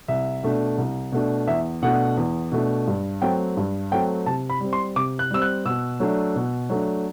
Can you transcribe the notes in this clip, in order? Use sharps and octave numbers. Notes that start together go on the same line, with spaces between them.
C2 E5
B2 A3 D4
C2
B2 A3 D4
E2 E5
B2 A3 D4 F#5
E2
B2 A3 D4
G2
F#3 A3 C4 G5
G2
F#3 A3 C4 G5
C3 A5
B5
G3 C4
C6
C3 D6
F#6
G3 C4 E6
F#6
B2 E6
F#3 A3 D4
B2
F#3 A3 D4